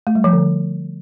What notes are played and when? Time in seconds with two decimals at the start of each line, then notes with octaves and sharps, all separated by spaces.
0.07 A3
0.15 G3
0.24 F3
0.33 D3